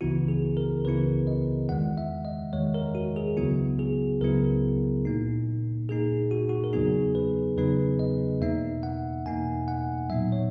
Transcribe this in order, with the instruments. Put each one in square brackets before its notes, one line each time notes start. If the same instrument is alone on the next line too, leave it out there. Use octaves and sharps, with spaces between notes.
[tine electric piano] C#2 C#3 E3 B3 E4 F#4
G#4
A#4
C#2 C#3 E3 B3 E4 B4
D#5
E2 D#3 G#3 F#5
E5
D#5
E2 D#3 G#3 C#5
A#4
F#4
G#4
C#2 C#3 F#3 B3 E4 F#4
G#4
C#2 C#3 F#3 B3 E4 A#4
A#2 A#3 D#4
A#2 A#3 D#4 G#4
F#4
F#4
A#4
E2 C#3 F#3 B3 D#4 G#4
B4
E2 C#3 F#3 B3 D#4 B4
D#5
E2 B2 A#3 D#4 E5
F#5
E2 B2 A#3 D#4 G#5
F#5
A#2 F#3 B3 D#4 E5
C#5